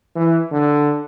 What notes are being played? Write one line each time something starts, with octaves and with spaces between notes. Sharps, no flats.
E3
D3